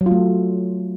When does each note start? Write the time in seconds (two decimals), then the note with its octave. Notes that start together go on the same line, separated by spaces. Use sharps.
0.01 F#3
0.06 F4
0.11 A3